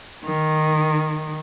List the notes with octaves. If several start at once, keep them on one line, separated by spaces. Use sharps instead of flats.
D#3